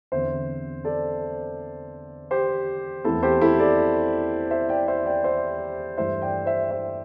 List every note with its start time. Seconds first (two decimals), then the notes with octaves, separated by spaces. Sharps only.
0.12 E2 D3 C4 C5 E5
0.85 A4 D5
2.31 G4 C5
3.05 E2 E3 A3 C4 E4 A4
3.23 G4 C5
3.41 E4 A4
3.59 A4 D5
4.51 C5 E5
4.69 D5 G5
4.88 C5 E5
5.06 D5 G5
5.24 C5 E5
5.97 G2 E3 A3 C5 E5
6.22 D5 G5
6.46 C5 E5
6.71 C5 E5